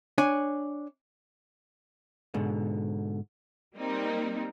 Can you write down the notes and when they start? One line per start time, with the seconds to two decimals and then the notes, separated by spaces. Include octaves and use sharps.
0.18 D4 C#5 G#5
2.34 G#2 B2 D3
3.76 G3 A#3 C4 D#4